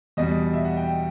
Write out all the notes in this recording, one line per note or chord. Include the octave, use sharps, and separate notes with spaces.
E2 B2 G3 D#5
E5
F#5
G5